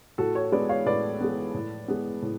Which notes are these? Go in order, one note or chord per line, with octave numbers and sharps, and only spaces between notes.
A2 F#4 A4
A4 C#5
G#3 B3 B4 D5
C#5 F5
A2 B4 D5
G#3 B3
A2
G#3 B3
A2